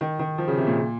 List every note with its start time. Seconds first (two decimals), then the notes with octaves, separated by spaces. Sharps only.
0.01 D#3
0.19 D#3
0.38 F3
0.48 C#3
0.57 C3
0.67 A#2